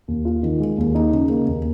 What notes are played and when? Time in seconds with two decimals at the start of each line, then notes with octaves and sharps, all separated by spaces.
0.08 D#2
0.25 F4
0.43 D#3
0.60 G#3
0.78 D#2
0.95 D#4
1.13 C#3
1.30 A#3
1.48 D#2